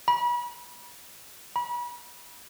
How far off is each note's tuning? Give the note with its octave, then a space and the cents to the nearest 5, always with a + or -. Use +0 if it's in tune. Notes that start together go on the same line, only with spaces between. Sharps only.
B5 -35
B5 -35